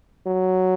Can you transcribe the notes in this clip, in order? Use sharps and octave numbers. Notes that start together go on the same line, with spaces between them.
F#3